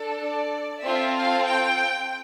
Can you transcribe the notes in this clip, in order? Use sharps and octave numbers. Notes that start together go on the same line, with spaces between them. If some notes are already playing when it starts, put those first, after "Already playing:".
Already playing: D4 A4
D5
C4 F4 A4 E5
F5
G5